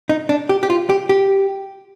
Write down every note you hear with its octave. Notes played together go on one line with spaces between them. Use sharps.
D#4
D4
G4
G4
F4
G4
G4